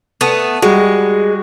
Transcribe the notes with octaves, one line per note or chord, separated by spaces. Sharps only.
A3 B3
G3 G#3 F#4